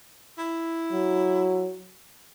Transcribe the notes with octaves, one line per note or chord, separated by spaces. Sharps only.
E4
F#3